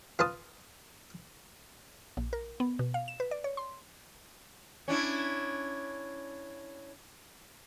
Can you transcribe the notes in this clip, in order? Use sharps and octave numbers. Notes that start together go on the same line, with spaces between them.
F4 B4 A5 D#6
A#1
A#4
B3
B2
F5
E7
B4
D5
C#5
C6
C#4 D4 E4